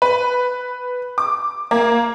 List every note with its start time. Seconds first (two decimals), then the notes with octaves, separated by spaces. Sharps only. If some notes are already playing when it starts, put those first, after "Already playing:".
0.02 B4
1.18 D6
1.71 A#3